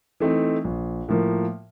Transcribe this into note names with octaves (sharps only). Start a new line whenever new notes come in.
E3 A3 C4 D#4
A#1
A2 F3 A#3